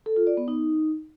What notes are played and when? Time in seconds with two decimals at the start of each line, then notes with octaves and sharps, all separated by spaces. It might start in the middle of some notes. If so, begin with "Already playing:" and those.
0.06 A4
0.16 F4
0.27 D5
0.37 B3
0.48 D#4